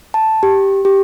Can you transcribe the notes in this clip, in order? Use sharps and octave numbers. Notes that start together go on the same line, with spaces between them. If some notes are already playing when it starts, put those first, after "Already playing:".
A5
G4
G4